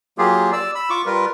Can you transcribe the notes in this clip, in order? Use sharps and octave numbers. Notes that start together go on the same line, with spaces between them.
F#3 A#3 F4 G4 G#4
D5 E6
B5 E6
F4 C#6 D6
G3 F4 A#4 B4